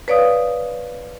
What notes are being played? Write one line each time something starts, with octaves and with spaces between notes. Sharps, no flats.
B4 C#5 D5 F5 D#6